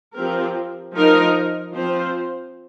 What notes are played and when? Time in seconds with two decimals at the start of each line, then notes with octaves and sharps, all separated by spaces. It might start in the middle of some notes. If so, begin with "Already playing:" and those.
0.13 F3 C4 G4 A#4
0.93 F3 D#4 A#4
1.72 F3 C4 F4 C5